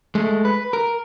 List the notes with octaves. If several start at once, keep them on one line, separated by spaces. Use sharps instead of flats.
G#3 A3
B4
A#4